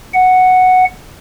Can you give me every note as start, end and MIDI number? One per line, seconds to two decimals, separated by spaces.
0.14 0.85 78